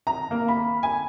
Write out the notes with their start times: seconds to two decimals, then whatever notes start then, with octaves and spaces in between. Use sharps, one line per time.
0.07 A#5
0.31 A#3
0.48 B5
0.83 G#5